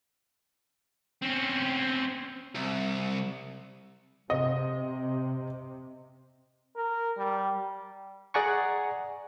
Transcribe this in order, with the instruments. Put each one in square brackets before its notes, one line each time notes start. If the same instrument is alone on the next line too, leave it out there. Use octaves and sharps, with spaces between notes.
[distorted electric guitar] C4 C#4
C2
[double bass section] C3 [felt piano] D#5
[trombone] A#4
G3
[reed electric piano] G#4 D5 F#5 G#5 A#5 C#6